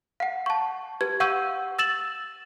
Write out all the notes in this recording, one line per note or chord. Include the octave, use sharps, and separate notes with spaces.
F5 F#5
A5 C#6
G4 B4 G#6
F5 F#5 C#6 E6 G6 D#7
E6 A6 E7 F#7